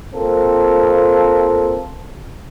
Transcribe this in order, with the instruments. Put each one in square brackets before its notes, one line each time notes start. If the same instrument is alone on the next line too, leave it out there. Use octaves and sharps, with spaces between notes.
[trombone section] A#3 C4 F4 A4